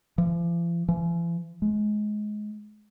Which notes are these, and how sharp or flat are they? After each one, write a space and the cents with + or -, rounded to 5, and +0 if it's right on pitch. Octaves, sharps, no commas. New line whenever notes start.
F3 -45
E3 +45
G#3 +20